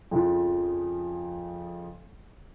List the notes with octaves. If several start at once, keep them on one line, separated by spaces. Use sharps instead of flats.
F2 C#3 F3